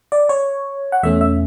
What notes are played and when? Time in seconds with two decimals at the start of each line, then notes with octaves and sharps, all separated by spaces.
0.12 D5
0.29 C#5
0.92 F#5
1.03 E2 B2 A3 C#4 E5
1.21 E5